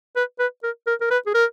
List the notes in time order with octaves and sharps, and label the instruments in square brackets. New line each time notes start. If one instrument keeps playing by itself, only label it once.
[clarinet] B4
B4
A#4
A#4
A#4
B4
G#4
A#4